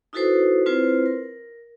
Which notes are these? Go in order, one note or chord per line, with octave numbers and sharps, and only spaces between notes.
D#4 E4 F#4 A4 B4 C5
C4 E4 F4 B4 C5
A#4